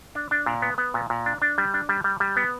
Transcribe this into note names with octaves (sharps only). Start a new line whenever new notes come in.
D4
D4
A#2
B3
B3
A#2
A#2
D4
D4
G3
D4
G3
G3
G3
B3